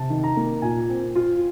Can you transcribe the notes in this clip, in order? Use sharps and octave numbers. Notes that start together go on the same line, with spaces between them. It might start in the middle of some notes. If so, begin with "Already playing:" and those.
Already playing: C3 A5
D#3
A#5
A#3
A#2 G#5
C4
F4